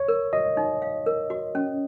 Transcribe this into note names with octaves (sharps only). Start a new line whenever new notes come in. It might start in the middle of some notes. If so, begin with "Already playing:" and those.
Already playing: C#5
A#4
F#4 D#5
D#4
F5
A#4
F#4
C#4